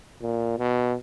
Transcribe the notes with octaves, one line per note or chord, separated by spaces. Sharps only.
A#2
B2